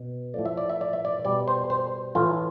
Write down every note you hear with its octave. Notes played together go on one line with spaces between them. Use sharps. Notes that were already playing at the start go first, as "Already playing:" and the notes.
Already playing: B2
A2 F3 A3 D5
E5
D5
E5
D5
E5
D5
B2 G3 D5
C5
C5
A2 E3 A3 F4